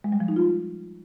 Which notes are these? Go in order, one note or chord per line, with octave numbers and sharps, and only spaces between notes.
G#3
G3
F3
D#4
F4